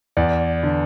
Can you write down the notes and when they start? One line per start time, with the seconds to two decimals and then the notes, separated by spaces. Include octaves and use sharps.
0.17 E2 D5
0.63 D3